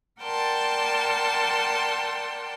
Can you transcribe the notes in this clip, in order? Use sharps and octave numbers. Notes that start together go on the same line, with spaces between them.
A#4 D5 F#5 G5 A5 C6